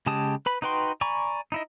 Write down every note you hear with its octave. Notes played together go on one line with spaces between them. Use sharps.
C#3 G#3 G4 A5 D#6
B4 B5
D#4 F#4 B4 G5 C6
D5 G#5 A#5 B5 C#6
D#4 E4 D#5